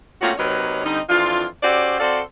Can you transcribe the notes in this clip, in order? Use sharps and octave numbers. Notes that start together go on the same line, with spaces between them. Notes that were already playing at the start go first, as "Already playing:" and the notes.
A3 A#3 C4 C#4 F4 F#4
C3 F#3 A#3 D#4 B4 C#5
D3 G3 C4 D#4
F2 E3 D4 F4
C#4 F#4 G4 A4 C5 D5
C4 F#4 A4 C5 D5 F5